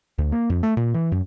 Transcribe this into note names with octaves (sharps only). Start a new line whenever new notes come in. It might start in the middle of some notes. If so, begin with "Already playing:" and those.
D2
A#3
F2
A3
A#2
E3
F#2